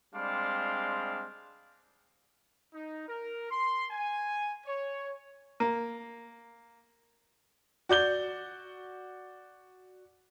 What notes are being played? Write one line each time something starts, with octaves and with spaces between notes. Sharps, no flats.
G3 G#3 C4 D4 F5 C6
D#4
A#4
C6
G#5
C#5
A#3
F#4 D5 G6 G7